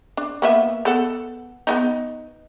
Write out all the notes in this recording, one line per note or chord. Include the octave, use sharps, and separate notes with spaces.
D4
A#3 B3 E5
B3 A4 F#5
B3 D4 D#4